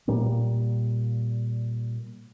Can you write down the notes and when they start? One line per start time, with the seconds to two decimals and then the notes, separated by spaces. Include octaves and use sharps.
0.08 A#2 G3 A#3